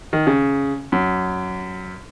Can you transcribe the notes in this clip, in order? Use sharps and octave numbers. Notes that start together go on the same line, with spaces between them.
D#3
C#3
F#2